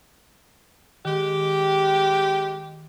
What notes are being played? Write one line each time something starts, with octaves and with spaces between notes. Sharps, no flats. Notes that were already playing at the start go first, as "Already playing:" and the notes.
D#3 G#3 G4